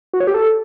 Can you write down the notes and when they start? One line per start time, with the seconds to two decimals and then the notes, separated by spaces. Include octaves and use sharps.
0.13 F#4
0.20 C#5
0.27 G4
0.34 A4